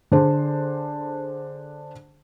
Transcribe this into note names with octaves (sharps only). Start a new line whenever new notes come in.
D3 D4 G#4 C5